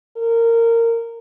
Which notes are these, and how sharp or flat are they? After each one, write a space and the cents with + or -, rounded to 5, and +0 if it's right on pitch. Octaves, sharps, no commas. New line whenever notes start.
A#4 -15